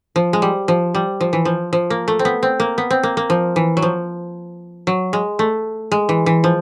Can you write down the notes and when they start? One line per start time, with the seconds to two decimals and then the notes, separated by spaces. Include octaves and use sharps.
0.16 F3
0.33 G#3
0.42 G3
0.68 F3
0.95 G3
1.21 F3
1.33 E3
1.45 F3
1.73 F3
1.90 A#3
2.08 A3
2.19 C4
2.25 B3
2.43 C4
2.60 A#3
2.78 B3
2.91 C4
3.03 A#3
3.17 A#3
3.30 F3
3.56 E3
3.77 F#3
3.82 F3
4.87 F#3
5.13 G#3
5.39 A3
5.92 G#3
6.09 E3
6.26 E3
6.44 F3